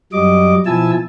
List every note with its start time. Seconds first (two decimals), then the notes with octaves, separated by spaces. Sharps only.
0.13 F#2 F#3 G3 D#5 D6
0.66 B2 F3 E4 G#5 A5 E6